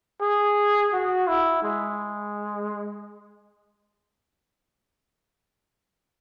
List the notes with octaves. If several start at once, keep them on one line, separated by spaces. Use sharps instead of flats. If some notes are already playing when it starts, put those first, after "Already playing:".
G#4
F#4
E4
G#3